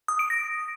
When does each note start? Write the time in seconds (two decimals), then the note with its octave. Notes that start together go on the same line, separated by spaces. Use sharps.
0.08 D#6
0.19 D7
0.30 A#6